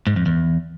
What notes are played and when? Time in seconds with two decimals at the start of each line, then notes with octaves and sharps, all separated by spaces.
0.07 G#2
0.16 F2
0.26 E2